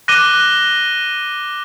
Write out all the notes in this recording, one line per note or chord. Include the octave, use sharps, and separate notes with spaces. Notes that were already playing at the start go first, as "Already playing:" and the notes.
D6 F#6 A#6 D#7 G7